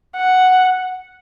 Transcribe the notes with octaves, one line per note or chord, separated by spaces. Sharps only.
F#5